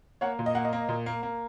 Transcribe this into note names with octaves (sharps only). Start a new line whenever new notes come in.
A#3 C#5 F#5
A#2
D#5
A#3 F#5
D#5
A#3
A#2
A#3
A#3